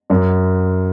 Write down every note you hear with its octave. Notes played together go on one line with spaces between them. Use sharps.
F#2